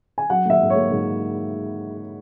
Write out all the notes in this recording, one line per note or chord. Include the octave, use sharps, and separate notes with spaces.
G#5
F#3 F#5
A#3 E5
G#2
C#5
A#3
G#2